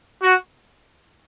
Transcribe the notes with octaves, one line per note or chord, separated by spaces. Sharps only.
F#4